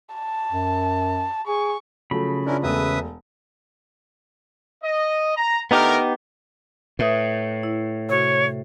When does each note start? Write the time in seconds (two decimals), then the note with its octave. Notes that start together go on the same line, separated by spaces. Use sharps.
0.15 A5
0.52 F#2
1.48 G#4 C#6
2.11 C#3 F3 F#3 A3 B5
2.46 C#4 D4 E4 F4 A#4
2.63 E1 A3 B4 E5 D#6
4.83 D#5
5.36 A#5
5.71 D3 A3 B3 D#4 G4 A#4
6.99 A2 B4 E5 D#6
7.63 E4
8.09 C3 F#4 C#5